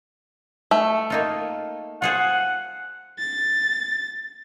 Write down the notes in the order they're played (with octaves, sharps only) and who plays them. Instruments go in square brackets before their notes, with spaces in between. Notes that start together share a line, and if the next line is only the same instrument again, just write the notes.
[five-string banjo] A3
[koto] A#3 D#4 F4
[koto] F4 G#4 C5 [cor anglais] F#5
[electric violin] A6